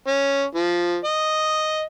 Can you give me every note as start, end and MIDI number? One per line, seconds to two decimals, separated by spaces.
0.08 0.44 61
0.55 0.98 53
1.05 1.83 75